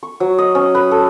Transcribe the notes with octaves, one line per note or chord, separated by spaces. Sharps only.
C#6
F#3
D#5
C#4
B4
A4